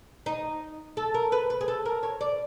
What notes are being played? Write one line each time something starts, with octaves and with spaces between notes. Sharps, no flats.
D#4
A4
A#4
B4
B4
G#4
A4
A#4
C#5
D5